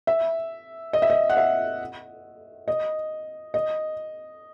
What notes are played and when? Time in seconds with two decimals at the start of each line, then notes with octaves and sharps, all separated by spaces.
0.07 E5
0.93 D#5
1.02 E5
1.10 D#5
1.30 F#5
1.37 E5
2.68 D#5
3.54 D#5